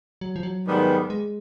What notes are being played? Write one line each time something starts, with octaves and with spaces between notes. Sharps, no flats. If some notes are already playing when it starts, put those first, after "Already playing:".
F#3
F3
F#3
G#2 D#3 G3 B3
G#3